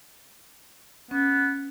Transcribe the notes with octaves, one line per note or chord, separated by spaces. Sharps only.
B3 C#4